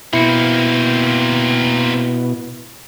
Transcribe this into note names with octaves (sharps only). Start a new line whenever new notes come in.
B2 A#3 C4 E4 C#7